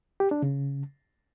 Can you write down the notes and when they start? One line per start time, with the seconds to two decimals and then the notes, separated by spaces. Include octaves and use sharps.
0.20 G4
0.31 D4
0.42 C#3